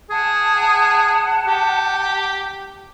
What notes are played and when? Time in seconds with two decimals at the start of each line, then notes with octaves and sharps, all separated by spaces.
0.11 G#4 F#5 A5
1.47 G4